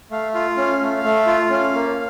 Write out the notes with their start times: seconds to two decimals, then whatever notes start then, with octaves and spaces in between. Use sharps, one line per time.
0.11 A3 F5
0.35 F4 F5
0.57 C#4
0.81 A3
1.04 A3
1.27 F4
1.50 C#4
1.74 A#3